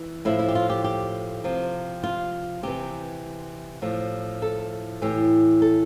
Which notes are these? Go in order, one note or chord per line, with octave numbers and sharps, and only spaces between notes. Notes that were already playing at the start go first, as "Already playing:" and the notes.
Already playing: E3
A2 F3 E4
E4
G4
F4
G4
G4
C3 F3
F4
C3 E3 G4
A2 F3
A4
A2 E3 G4
A4